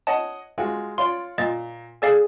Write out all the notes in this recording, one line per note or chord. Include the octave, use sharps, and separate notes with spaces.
C#5 D#5 F#5 A5
G#3 F4 F#4
F4 C#5 D5 C6
A#2 D#5 A6
G#4 A4 D5 F5 G#5